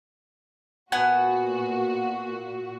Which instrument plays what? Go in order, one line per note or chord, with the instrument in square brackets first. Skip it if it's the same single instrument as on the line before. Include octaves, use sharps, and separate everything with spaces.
[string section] A#2 F#4 [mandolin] B3 F#5 G#5